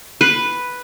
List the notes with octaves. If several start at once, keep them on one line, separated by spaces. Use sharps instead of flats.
B4